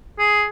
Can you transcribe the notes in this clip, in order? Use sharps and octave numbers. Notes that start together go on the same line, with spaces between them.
G#4